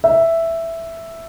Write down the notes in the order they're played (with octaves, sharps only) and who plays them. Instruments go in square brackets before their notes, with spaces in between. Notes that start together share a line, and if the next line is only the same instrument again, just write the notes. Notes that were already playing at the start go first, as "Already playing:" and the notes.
[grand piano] E5